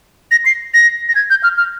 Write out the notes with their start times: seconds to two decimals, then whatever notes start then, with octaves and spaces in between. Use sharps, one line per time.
0.31 A#6
0.46 C7
0.74 A#6
1.09 A#6
1.15 G#6
1.30 G6
1.43 F6
1.57 F6